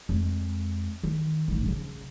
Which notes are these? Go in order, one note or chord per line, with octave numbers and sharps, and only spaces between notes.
F2 G#3
D#3
A1 G#2
C#3 F3